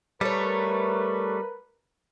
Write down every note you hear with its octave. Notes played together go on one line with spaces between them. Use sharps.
G3 A3 A#4 B4 C#5